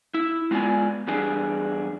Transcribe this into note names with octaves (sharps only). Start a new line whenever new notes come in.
E4
G#3 B3 F4 F#4 D5 G#5
E2 G3 D4 G#4